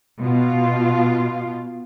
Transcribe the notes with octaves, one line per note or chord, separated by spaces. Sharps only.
B2 F4